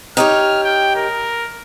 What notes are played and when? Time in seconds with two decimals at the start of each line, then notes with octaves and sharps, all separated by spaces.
0.17 D#4 G4 C#5 F6
0.63 G5
0.96 A#4